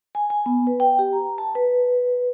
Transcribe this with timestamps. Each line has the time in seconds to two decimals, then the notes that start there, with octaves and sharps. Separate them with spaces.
0.15 G#5
0.30 G#5
0.46 B3
0.67 B4
0.80 G5
0.99 G4
1.13 A#5
1.38 A5
1.55 B4